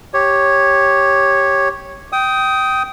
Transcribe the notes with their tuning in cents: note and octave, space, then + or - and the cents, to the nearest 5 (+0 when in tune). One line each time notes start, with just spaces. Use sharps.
G4 +0 C#5 -5
G5 -15 D#6 +15